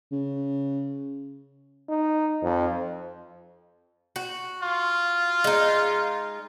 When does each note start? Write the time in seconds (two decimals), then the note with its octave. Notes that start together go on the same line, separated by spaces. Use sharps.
0.12 C#3
1.89 D#4
2.43 F2
4.16 F#4
4.63 F4
5.44 G#3 D#4